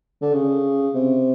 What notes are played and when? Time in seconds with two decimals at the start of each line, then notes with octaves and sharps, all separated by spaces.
0.22 D3
0.33 C#3
0.95 C3